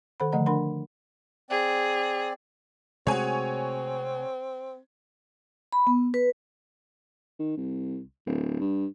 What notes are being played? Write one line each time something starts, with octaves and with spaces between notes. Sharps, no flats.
D#3 A4 C5 F#5 B5
D3 F3 A3 D#5 F#5 A#5
D4 A#4 F#5 B5 C6
C4 G#4 D5
C3 G#3 A3 C4 F#4 G#4 C#5 G#5
B5
B3
B4
D#3
C2
D1
G2